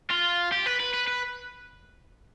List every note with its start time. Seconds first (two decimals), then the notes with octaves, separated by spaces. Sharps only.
0.10 F4
0.52 G4
0.66 B4
0.80 B4
0.94 B4
1.07 B4